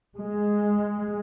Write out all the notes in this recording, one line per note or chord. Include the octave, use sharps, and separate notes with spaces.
G#3